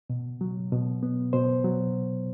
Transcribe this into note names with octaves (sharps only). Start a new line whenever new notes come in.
B2
F#3
B2
B3
B2 C5
F#3